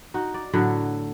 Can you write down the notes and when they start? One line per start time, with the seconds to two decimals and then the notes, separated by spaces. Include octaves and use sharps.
0.14 D#4 F#4
0.34 D5
0.53 A2 D3 F#3 F#4